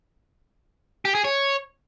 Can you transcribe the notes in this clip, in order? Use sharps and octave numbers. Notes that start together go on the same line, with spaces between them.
G4
G#4
C#5